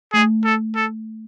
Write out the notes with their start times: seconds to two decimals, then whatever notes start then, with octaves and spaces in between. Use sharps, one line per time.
0.13 A3 G#4
0.44 A4
0.76 A4